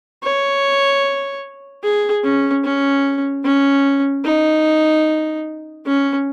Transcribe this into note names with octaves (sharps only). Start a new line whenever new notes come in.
C#5
G#4
C#4
C#4
C#4
D#4
C#4